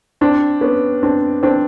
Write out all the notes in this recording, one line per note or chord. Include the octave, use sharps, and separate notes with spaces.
C4 D4
B3 C#4
C4 D4
C4 D4